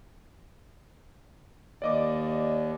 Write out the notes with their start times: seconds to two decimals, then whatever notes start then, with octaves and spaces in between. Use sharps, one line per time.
1.82 D#2 D5 D#5 D6